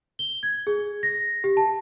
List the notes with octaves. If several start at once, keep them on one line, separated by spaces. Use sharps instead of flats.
G7
G#6
G#4
A#6
G4
A5